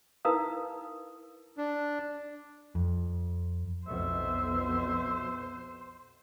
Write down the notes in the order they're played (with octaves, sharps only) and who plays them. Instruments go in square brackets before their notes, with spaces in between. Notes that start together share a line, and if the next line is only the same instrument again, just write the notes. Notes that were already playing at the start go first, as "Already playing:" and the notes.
[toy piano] D#4 E4 A#4 B4 F5 D#6
[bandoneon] D4
[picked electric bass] F2
[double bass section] B1 F2 B2 [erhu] C5 [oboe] E5